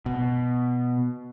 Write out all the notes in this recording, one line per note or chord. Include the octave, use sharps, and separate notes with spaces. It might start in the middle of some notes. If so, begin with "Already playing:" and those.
B2